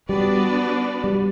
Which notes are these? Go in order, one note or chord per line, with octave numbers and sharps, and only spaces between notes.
G3 B3 D4 F#4 B4 D5
G3